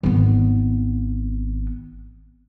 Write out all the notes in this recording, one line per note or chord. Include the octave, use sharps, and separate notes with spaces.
G#1 B3